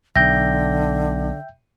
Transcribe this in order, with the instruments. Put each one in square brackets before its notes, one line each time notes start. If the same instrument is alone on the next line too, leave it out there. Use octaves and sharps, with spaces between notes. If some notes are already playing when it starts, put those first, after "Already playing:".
[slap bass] B1 [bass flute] D3 [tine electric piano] E5 G5 G6 [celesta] A#6